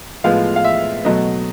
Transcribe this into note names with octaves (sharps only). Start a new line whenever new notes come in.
A2 F3 G#3 B3 F5
F5
E5
B2 F#3 A3 D#5